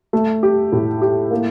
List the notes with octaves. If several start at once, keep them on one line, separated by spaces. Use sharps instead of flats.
A3
G4
A2
G4
A#3